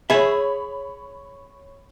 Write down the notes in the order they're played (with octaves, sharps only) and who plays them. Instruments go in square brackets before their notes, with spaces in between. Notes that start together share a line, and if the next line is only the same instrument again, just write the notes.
[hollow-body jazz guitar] G#4 E5 [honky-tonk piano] C#5 B5